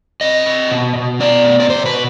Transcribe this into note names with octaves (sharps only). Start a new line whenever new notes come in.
C3 D#5
C3
B2
B2
B3 D5
B2
D5
B2 C5
B4
B2